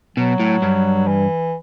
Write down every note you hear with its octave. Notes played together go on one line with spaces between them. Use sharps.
B2 F#3
A2
G2
E3